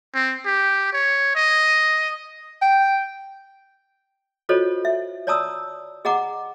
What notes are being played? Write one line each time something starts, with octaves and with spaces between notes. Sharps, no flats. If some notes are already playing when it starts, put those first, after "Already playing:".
C4
G4
C#5
D#5
G5
F4 F#4 A4 C5 C#5 D#5
E5
C#5 D5 A5 A#5 D#6 E6
G#4 D#5 F#5 A#5 D6